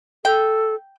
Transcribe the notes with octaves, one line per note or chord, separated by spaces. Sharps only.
A4 G5